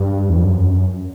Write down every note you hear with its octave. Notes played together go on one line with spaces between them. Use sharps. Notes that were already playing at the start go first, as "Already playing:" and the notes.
Already playing: G2
E2
F2
F#2